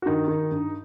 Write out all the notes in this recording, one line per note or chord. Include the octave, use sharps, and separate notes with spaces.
F#4
G2 D#3 D#4
D#3
G2